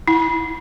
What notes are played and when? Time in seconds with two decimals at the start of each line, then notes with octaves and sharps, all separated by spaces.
0.08 E4